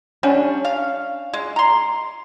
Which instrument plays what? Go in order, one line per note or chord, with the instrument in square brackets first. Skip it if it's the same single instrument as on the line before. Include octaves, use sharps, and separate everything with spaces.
[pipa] G3 [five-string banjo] C#4 D4 G#5
[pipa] F5
G#3
A#5 C6